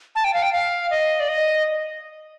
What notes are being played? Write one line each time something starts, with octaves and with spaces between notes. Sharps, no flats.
A5
G5
F5
G5
F5
D#5
D5
D#5